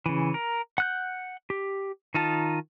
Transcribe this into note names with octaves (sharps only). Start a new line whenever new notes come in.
C#3 E3
A#4
F#5 F#6 G6
G4
D#3 D#4 F4 A5